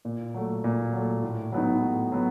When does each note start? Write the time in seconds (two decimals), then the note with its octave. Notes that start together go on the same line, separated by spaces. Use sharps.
0.05 A#2
0.34 F#3 A3
0.64 A#2
0.93 F#3 A3
1.23 A2
1.52 F#3 B3 D#4
1.82 A2
2.12 F#3 B3